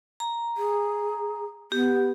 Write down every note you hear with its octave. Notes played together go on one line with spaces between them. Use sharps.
A#5
G#4
B3 G4